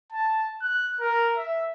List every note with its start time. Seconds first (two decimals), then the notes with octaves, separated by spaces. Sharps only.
0.13 A5
0.62 F#6
1.00 A#4
1.37 E5